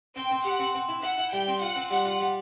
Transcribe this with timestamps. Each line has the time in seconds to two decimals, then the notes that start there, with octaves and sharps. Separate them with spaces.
0.16 C4 G5
0.31 C4
0.45 G4 F#5
0.59 C4
0.75 C4
0.89 E4
1.03 E4 F#5
1.18 E4
1.33 G3 G5
1.48 C4
1.61 F4 F#5
1.76 C4
1.90 G3 F#5
2.05 F4
2.20 G3